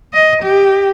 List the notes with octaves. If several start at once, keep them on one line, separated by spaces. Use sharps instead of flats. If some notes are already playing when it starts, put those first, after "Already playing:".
D#5
G4